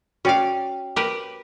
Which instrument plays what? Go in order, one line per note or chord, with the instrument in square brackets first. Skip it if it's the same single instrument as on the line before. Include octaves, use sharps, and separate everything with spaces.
[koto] C#4 D5 F5 [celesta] F#4 C#5 G5
[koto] G4 A#4 B4